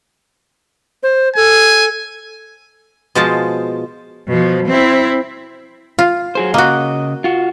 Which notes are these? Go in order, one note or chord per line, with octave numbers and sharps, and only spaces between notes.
C5
A4 G#5
B2 F3 G#3 F4 C5 A5
B2 F3
C4 E4
F4
F#3 G#4 C5
C#3 A#3 F#4 D#5
F4 F#4